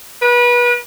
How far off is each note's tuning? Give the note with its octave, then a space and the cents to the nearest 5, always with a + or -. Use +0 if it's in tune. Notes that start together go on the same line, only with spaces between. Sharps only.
B4 -30